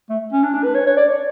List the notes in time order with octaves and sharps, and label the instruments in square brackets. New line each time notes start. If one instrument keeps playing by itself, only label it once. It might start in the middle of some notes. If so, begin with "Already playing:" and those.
[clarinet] A3
C#4
D4
D4
B4
C#5
C#5
D5
C#5